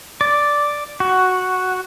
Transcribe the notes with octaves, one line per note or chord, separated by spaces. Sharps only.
D5
F#4